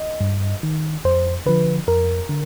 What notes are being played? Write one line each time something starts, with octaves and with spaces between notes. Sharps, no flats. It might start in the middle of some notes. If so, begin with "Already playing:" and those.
Already playing: D#5
G2
D#3
F2 C5
D3 F3 B4
F2 A#4
D3